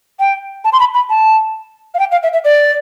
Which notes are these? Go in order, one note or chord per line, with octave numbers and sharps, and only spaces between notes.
G5
A5
C6
B5
B5
A5
F5
G5
F5
E5
E5
D5